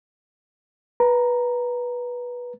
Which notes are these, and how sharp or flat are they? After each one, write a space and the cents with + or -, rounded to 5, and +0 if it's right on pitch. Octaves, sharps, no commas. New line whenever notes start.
B4 -15 A#5 +0